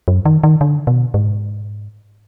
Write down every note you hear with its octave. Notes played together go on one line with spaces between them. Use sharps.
F#2
D#3
D#3
D3
B2
G#2